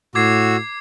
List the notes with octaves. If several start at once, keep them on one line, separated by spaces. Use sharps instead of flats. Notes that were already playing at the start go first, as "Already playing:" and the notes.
A2 F#4 D6 E6 G#6 C7